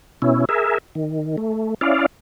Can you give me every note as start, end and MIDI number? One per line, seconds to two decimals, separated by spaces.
0.22 0.45 47
0.22 0.45 61
0.22 0.45 64
0.49 0.78 68
0.49 0.78 70
0.49 0.78 76
0.95 1.36 51
1.37 1.74 57
1.81 2.06 61
1.81 2.06 64
1.81 2.06 74
1.81 2.06 77